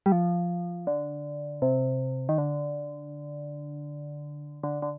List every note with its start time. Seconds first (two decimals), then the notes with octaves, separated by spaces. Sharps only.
0.06 G3
0.12 F3
0.87 D3
1.62 C3
2.29 D#3
2.38 D3
4.63 D3
4.82 D3